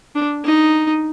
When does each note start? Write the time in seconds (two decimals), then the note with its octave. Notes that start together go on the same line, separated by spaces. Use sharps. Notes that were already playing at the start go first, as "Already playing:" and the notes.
0.15 D4
0.45 D#4